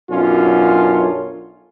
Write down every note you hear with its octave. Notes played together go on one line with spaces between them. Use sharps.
B1 F#2 C#4 D4 F4